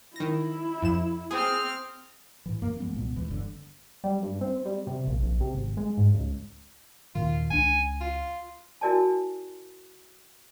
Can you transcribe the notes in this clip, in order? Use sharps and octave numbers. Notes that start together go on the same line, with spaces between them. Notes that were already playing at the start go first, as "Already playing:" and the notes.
D#3 E4 A#6
F2 E7
C4 G#4 D#6 F6
A2 E3
F#2 A#3
E3 G#3 B3
C2 A#2 B3
D#2 E3 G#3
G1 D3
G3
G2
C4
G3
C3
A#1
A#1
C3
G#1
G#3
G#2
C#2
D#2 A#2 D#3 F4
C#2 D4 G#5
F4
E4 F#4 A#4 D5 G#5 A5